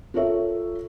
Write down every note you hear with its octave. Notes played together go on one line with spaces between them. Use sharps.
F4 A4 A#4 C#5 E5